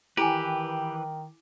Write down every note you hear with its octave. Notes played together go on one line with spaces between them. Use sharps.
D#3 E3 E4 G4 A4 B4 G#5